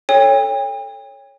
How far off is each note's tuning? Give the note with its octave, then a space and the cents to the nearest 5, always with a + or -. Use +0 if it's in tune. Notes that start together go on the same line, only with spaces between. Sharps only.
A4 +0 C#5 +0 G5 +40